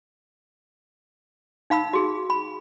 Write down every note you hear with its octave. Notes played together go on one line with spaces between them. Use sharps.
D#4 F5 B5 E6
F#4 G#4
B5